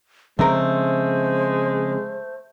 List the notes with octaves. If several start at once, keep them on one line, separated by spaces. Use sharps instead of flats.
C#3 F3 G#3 A3 C4 A#4 C5